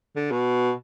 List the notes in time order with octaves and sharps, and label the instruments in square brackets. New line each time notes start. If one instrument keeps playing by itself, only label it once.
[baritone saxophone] D3
B2